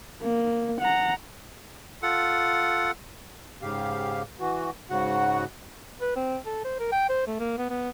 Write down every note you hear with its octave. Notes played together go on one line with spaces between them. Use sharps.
A#3
F#5 A#5
F4 A4 F#5
G#2 C#3 G4 F5
E3 F#4
G#2 C#3 F#4 F#5
B4
C4
A4
C5
A#4
G5
C5
A3
A#3
B3
B3